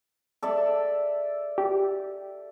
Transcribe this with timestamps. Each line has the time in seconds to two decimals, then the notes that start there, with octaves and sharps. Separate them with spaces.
0.43 A4 D5 E5
1.58 G4